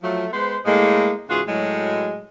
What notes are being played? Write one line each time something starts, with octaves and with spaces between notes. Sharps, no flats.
F3 F#3 A3
G#3 B3 B4 C5
A2 G#3 A#3
G#2 C#3 E3 F4 F#4 G#4
A2 F#3 G#3